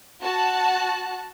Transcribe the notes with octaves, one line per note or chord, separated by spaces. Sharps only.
F#4 A5 F#6